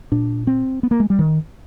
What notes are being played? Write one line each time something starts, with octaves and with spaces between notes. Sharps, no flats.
A#2 D4
C4
B3
A#3
G#3
G3
D#3